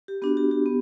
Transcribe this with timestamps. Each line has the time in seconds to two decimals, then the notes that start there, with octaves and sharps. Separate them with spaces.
0.08 G4
0.22 B3 D4 F#4 G4
0.37 G4
0.51 G4
0.66 B3